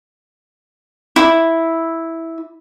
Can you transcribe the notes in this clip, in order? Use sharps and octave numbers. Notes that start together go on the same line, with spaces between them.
E4